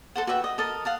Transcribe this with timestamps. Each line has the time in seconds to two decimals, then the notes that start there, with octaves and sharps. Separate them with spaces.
0.15 A4 C5 F#5
0.27 F#4 B4 E5 G5
0.44 D#5
0.58 A4 A#4 D#5 A5
0.85 F5 F#5 A5